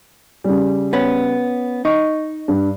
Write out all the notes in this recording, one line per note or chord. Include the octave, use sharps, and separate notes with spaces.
C#3 G3
B3 C#4 B4
D#4 C#6
G2